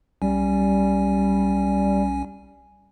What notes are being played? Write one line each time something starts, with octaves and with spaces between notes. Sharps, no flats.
B1 G3 C#4 G#5